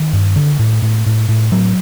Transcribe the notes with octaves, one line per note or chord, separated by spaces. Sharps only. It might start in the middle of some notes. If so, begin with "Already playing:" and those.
Already playing: D#3
G2
D3
A2
A2
A2
A2
A2 F#3